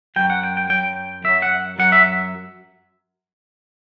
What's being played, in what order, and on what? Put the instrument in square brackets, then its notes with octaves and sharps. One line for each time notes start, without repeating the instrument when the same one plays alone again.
[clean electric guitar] F#2 F#3 G5
F#5
G5
G5
F#2 F#3 G5
F#2 F#3 E5
F#5
F#2 F#3 F#5
E5